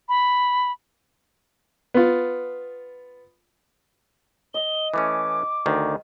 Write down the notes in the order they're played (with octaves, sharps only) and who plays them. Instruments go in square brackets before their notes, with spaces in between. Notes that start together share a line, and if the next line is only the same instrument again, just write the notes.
[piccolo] B5
[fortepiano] B3 F4
[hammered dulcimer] D#5 [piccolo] G7
[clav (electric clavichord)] E3 A3 C#4 [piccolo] D6
[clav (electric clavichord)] D2 D#3